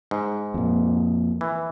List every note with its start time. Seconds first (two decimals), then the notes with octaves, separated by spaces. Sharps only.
0.11 G#2
0.54 F2 A#2
1.41 E3